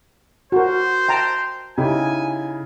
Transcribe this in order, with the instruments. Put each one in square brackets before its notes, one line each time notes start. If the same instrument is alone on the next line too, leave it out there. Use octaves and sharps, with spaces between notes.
[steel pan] F#4 A#4 [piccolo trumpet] C5
[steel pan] G5 A5 A#5
[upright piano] C#3 D#4 E4 [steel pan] G4 [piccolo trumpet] G#5